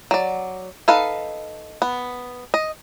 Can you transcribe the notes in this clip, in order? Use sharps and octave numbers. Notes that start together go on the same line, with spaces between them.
F#3 D5
D#4 A4 B4 F5
B3
D#5